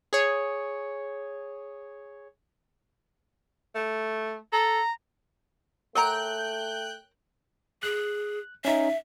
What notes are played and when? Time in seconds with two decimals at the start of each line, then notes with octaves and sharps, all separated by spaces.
0.13 G#4 C#5
3.76 A3
4.53 A4 A#5
5.95 A3 A#4 C#5 F#5 G5 A#5 F#6 G6
7.83 G#4 F#6
8.65 C#4 D#4 E5